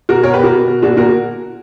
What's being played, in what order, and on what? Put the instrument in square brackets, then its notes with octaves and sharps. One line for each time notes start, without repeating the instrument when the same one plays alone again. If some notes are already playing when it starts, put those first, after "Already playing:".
[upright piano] B2 F#4 A#4
B2 A#4 C#5
G4 B4
B2 F#4 A#4
B2
B2
A#2 D4 F#4
A#2 F#4 A#4